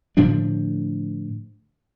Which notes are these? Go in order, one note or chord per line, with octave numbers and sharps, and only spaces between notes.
A2 D3 F3 D4